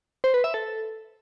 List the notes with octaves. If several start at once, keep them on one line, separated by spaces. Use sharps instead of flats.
C5
B4
E5
A4